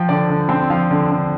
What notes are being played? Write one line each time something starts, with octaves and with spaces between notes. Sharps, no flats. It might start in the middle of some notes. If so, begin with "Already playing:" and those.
Already playing: F3 G5
D3 D5
D3
C4
F3 F5
D3
D3